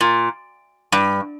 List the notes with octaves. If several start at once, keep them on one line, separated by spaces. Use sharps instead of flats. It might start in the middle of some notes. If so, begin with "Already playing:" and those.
A#2
G2